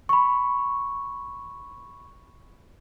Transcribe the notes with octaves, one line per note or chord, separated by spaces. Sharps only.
B5 C#6